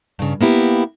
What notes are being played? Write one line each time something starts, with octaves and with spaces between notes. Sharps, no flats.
G2 C#3
A#3 B3 E4 G4